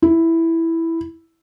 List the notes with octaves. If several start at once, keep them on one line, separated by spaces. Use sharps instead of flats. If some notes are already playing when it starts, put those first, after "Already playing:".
E4